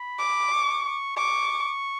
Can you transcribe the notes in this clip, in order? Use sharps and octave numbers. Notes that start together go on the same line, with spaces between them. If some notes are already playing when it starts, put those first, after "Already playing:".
Already playing: B5
D6
C#6
C#6
C#6 D6